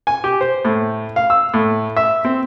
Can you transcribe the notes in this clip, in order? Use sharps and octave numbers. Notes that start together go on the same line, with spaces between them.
G#5
G4
C5
A2
F5
E6
A2
E5
C4